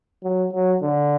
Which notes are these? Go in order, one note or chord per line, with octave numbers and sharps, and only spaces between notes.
F#3
F#3
D3